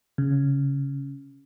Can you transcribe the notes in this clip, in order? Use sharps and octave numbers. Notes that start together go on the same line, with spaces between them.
C#3